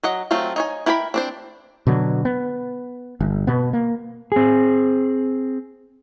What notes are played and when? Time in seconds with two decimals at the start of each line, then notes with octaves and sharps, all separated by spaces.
0.03 F#3 D#5 F#5
0.31 F#3 A3 C4 F4
0.56 D#4 C#5 G#5
0.86 E4 A#4 G5 G#5 B5
1.14 C4 D4 C5
1.87 B2 D3 F#3
2.25 B3
3.20 G1
3.47 B2 B3
3.73 A#3
4.32 C4 G#4